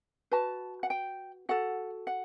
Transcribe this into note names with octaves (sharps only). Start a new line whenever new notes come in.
F#4 B4 A5
F#5
G5
F#4 A4 F#5
F#5